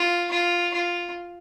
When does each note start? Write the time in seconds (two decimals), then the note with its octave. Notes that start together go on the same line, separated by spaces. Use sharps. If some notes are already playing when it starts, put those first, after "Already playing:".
Already playing: F4
0.31 F4
0.73 F4